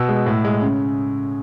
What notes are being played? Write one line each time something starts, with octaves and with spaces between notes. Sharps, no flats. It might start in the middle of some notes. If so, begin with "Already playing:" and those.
Already playing: B2 E6
G#3
A2
G#3
C#3